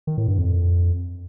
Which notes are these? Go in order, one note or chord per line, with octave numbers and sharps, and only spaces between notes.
D#3
A2
G2
F2